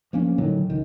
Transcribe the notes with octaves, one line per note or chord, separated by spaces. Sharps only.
F3 A#3 C#4
A2 D3 D#3 F#3
C#2 D#3